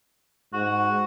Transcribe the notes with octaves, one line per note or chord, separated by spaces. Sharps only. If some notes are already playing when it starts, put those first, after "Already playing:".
G#2 F#4